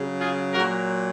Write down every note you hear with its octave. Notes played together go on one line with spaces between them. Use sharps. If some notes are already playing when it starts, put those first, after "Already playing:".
Already playing: C#3 F#3
F4 G#4
A#2 F#3 F#4 A#4